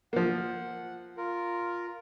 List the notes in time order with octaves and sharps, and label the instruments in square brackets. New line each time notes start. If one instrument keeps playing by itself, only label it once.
[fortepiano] F3 A#3 [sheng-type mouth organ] F#5
[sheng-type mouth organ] F4 A#4